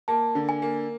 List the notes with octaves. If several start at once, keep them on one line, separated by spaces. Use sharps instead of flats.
A#3 A5
D3
G#5
A#3